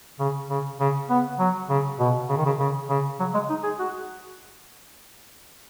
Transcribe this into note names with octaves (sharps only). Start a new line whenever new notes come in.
C#3
C#3
C#3
B3
F#3
C#3
B2
C#3
D#3
C#3
C#3
C#3
F#3
G#3
D#4
G#4
F#4